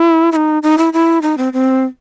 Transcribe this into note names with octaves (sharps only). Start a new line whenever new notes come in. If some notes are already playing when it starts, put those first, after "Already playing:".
Already playing: E4
E4
D#4
D#4
E4
E4
D#4
C4
C4